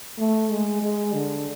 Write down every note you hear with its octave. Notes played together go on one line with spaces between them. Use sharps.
A3
G#3
G#3
D3